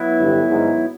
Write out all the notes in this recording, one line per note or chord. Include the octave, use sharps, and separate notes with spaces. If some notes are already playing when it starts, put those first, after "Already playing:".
Already playing: F#3 B3 E4
G1 G2
G#1 G#2